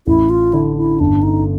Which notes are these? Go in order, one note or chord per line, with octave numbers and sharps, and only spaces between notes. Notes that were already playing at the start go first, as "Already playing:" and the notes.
A1 E4
F4
D3 E4
E4
G1 D4
D#4